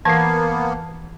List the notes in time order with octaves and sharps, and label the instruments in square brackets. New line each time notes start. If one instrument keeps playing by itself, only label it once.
[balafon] E3 [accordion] A#3 B3 [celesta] A5 [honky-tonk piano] G#6 C7